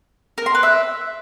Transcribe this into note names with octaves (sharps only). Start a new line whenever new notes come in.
A#4
C6
B4
E5